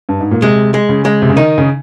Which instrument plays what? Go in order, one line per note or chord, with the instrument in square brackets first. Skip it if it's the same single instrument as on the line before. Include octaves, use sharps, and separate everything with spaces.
[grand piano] G2
G#2
A#2
[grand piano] C3 [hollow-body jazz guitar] G#3
[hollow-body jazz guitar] G#3
[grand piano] C#3
[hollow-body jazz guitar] G#3
[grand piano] C3
C#3
[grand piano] D#3 [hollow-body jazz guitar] D#4
[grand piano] C#3